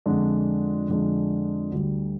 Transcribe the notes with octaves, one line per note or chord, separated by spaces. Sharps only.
F2 D3 F3 G#3 D4
F2 D3 F3 G#3 D4
D2 D3 G3